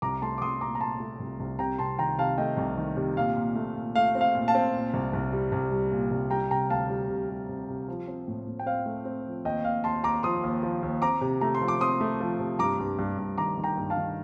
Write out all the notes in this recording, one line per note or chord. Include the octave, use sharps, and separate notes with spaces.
C2 A#5 D6
A3 A5 C6
D6
C2 C6 D#6
A#2 A#5 D6
A#5
A#2 A5 C6
A3
C2
C2
C3 G5 A#5
C3 A5 C6
D#3 G5 A#5
C3 F5 A5
A3 D#5 G5
C2
D#3
C3
A#2 F5
A#2
A3
A#2
A3 F5
C4
F5
A#2
F5 A5
C4
A#2
C2
C2
G3
C2
G3
A#2
C2
G3 G5 A#5
C3 G5 A#5
D2 F5 A5
G3
C3
G3
C3
C3
F3
C4
A2
A2
G5
C4 F5
A3
C4
F3
D#2 D#5 G5
D#2 F5
D#2 A5 C6
D#2 A#5 D6
F3 C6 D#6
D#2
F3
D#2
C4 A#5 D6
C3
A3 A#5
C6
F3
D6
C4 C6 D#6
A3
F3
C3
G2 A#5 D6
G2
G2
G2
D#3 A#5 D6
D#3
G5 A#5
G2
F5 A5
D#3